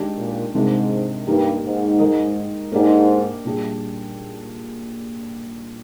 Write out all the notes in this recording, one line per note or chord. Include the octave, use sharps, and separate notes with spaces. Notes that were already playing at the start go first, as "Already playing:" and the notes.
Already playing: D#3 G#3 D4 G4
A#2
G#2 C3 D#3 G#3 D4
G2 D#3 A#3 D#4 G4
G#2
D#3 G#3 D#4 A#4 D#5
G#2 A#3 D4 G4 D5
A#2 G3 D4 G#4